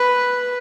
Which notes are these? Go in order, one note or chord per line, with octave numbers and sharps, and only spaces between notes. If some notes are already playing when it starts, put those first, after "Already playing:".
Already playing: B4